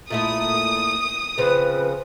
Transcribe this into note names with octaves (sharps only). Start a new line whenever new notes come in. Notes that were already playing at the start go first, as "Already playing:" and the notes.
A#2 A3 E4 D#6
C#3 F3 C4 B4